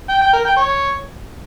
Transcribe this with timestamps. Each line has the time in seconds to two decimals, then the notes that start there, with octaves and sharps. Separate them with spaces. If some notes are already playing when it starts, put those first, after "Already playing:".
0.09 G5
0.21 G5
0.33 A#4
0.45 G5
0.57 C#5